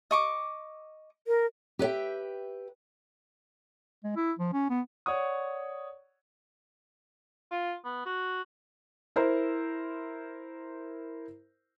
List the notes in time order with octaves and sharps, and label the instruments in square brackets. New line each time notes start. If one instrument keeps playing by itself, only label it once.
[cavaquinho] D#5 C#6 D6
[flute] A#4
[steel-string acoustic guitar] G4 B4 C#5 E5 G5
[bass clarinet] G#3
E4
F3
C#4
B3
[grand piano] C#5 D5 F#5 C#6 D#6
[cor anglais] F4
B3
F#4
[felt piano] E4 A#4 C5